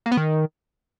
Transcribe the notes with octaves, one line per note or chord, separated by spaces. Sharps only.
A#3
B3
D#3